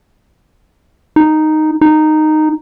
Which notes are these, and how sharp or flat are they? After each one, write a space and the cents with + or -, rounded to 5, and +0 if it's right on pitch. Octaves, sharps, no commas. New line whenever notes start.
D#4 -5
D#4 -10